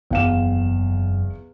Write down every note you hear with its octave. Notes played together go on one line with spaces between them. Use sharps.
F#1 E2 F5 E7